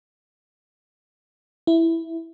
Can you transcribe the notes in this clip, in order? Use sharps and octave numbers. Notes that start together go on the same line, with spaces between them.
E4